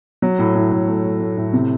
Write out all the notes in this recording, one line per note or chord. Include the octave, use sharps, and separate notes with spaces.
F#3
A2
A2
A2
A3
A3
A3
A2
C3